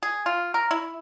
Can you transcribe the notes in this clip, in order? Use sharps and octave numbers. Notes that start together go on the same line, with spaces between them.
G#4
F4
A#4
E4